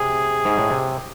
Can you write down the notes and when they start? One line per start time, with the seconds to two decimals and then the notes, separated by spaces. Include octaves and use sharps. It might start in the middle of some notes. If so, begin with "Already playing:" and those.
Already playing: C3 G#4
0.45 G#2
0.58 A2
0.70 C3